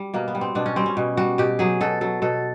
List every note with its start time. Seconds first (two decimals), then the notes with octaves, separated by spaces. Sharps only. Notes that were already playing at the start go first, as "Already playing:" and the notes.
Already playing: G3
0.14 B2 A#3
0.28 B3
0.35 G3
0.41 C4
0.55 B2 D4
0.66 C#4
0.76 G3 C4
0.86 C#4
0.97 B2
1.17 G3 F#4
1.38 B2 G4
1.59 F#3 G#4
1.81 B2 A4
2.01 F#3 A4
2.22 B2 A4